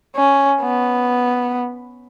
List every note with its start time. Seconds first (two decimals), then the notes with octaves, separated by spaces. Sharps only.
0.16 C#4
0.62 B3